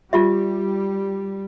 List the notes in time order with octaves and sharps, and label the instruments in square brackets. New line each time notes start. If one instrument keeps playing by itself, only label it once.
[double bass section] G3 [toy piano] F4 G4 E5